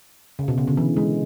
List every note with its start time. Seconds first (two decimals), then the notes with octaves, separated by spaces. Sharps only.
0.39 C#3
0.48 B2
0.58 C#3
0.67 D3
0.77 E3
0.97 G#3